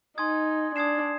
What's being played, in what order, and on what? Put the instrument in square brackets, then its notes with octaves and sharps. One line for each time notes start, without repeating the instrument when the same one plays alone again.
[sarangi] D#4 [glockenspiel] G#5 C6 D#6 G#6
[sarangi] D4 [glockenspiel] D#6 G#6 C7 E7